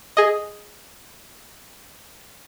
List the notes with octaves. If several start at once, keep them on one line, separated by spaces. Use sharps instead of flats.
G#4 D#5